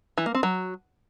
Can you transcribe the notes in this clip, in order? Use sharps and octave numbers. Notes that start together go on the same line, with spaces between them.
E3
A#3
C4
F#3